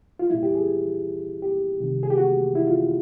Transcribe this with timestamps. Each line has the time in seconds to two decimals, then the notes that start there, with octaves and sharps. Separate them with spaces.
0.19 F4
0.30 A#2 G3 E4
0.43 G4
0.55 G#4
1.42 G4
1.80 C3 D#3 G3
2.03 G#4
2.10 G4
2.18 F#4
2.55 E4
2.67 F4